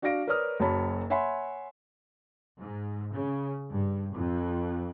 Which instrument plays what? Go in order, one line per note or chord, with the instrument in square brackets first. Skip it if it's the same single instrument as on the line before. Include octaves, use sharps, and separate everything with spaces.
[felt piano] D4 F#4 D5 F5 A#6 D7
A#4 B4 C#5 D5 D#6 F6
F#1 F#2 F#3 C#5 A5 B5
C#5 E5 F#5 G#5 B5 C6
[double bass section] G#2
C#3
G2
F2